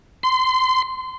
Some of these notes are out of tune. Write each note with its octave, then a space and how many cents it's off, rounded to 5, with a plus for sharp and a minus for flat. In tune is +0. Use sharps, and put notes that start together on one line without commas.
C6 -25